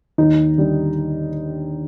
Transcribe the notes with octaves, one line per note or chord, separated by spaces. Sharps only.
D#2 D#4
D3 G3